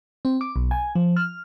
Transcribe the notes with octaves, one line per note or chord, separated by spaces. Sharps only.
C4
D6
B1
G#5
F3
F6